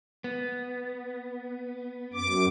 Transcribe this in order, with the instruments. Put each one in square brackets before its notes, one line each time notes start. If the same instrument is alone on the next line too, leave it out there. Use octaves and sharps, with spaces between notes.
[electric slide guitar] B3
[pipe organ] F#2 D6